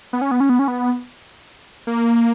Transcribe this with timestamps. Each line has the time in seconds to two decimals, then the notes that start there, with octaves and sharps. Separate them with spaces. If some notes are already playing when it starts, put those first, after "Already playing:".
0.13 B3
0.21 C#4
0.31 B3
0.40 C#4
0.49 B3
0.59 C#4
0.68 B3
1.87 A#3